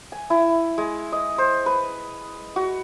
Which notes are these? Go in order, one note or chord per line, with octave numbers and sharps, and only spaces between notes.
G#5
E4
G#3
D#5
C5
B4
F#4